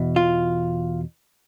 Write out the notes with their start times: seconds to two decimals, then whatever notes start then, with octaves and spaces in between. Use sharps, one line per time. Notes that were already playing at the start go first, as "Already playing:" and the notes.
Already playing: E2 B2
0.16 F4